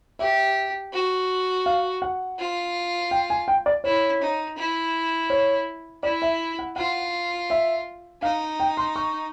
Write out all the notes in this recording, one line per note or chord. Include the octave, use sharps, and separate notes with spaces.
G4 E5
F#4
F5
F#5
F4
G5
G#5
G5
D5
E4 C#5
D#4
E4
C#5
E4 D5
E5
F#5
F4 F#5
E5
D#4 F5
G5
C6
C#6